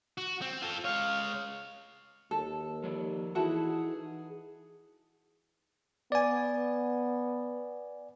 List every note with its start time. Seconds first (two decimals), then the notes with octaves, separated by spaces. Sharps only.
0.18 F#4
0.41 C4
0.62 F4 A4
0.85 G#3 C#5 F5
2.31 D#2 A4
2.83 F3 C#5 D5
3.35 E3 D#4 E4 F#4 G#4 A4 F#5
6.12 B3 D5 G#5